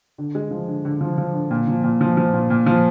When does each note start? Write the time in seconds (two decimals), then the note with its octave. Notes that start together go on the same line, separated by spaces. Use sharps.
0.18 D3
0.35 G#3
0.51 F3
0.68 D3
0.85 D3
1.01 F3
1.18 F3
1.34 D3
1.51 A#2
1.68 F3
1.84 A#2
2.01 F3
2.17 F3
2.33 A#2
2.50 A#2
2.66 F3